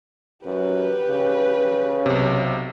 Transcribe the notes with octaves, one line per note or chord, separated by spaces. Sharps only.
F#2 G4 B4
C#3
B1 C3